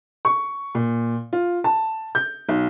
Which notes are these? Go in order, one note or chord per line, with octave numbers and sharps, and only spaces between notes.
C#6
A#2
F4
A5
G6
B1